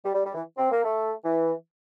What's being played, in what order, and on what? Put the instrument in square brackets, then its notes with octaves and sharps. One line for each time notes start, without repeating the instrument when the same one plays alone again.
[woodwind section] G3
G3
G3
E3
C4
A#3
A3
E3